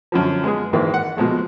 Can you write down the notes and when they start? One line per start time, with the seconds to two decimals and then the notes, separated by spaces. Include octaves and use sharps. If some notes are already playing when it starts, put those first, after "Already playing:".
0.12 F#2 D3 F3
0.44 G#3 B3 G#4
0.73 G#1 G#2 D#3 E3 A#3
0.94 F#5
1.17 B2 F3 G#3 A3